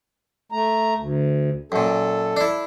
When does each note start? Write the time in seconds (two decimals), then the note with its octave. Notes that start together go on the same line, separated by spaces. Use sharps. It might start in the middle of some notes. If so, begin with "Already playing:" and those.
0.52 A3 A#5
0.98 D2
1.72 F#2 A#2 A4
2.37 D4 E4